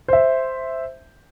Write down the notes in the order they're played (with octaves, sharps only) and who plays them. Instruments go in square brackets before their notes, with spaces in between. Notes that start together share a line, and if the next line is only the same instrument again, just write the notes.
[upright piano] C5 E5